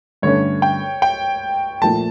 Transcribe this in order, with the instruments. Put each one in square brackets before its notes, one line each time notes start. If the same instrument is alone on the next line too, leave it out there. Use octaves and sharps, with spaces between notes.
[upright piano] G2 D3 A3 C#4 [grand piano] C#5
[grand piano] G5
G5
[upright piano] A#2 F3 A3 [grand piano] A5